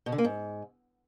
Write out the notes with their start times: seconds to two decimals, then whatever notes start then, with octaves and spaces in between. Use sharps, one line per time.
0.06 B2
0.12 D3
0.18 A#3
0.24 G#2